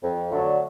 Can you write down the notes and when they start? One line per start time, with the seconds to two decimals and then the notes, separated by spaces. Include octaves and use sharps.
0.03 F2
0.31 D3 F#3 A3 D4